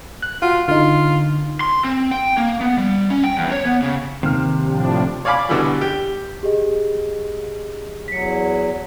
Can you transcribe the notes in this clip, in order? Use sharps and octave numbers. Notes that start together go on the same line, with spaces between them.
F#6
F4 F#4
D3 D#4 F4
C6
C4
G5
A#3
B3
G3
C#4
G5
E2
C#5
B3
C#3
D#2 C3 G4 F6
A2 F3 D4
C#5 D5 F5 G#5 B5 D6
B2 D3 E3 G3
G4
G4 G#4 D#5
E2 F#3 B6 C#7